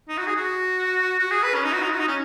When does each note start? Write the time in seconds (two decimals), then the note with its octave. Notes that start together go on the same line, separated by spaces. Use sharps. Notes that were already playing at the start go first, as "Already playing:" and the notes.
0.08 D#4
0.18 F#4
0.27 G#4
0.36 F#4
1.19 F#4
1.31 G#4
1.43 B4
1.54 C#4
1.64 D#4
1.73 F#4
1.82 D#4
1.91 F#4
1.99 D#4
2.07 C#4